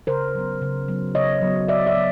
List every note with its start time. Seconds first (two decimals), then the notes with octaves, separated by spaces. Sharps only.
0.07 C#3 A#4 C5
0.35 F#3 B3
0.62 C#3
0.88 F#3 B3
1.15 C#3 C#5 D#5
1.42 F#3 B3
1.68 C#3 D5 E5
1.87 D5 E5
1.96 F#3 B3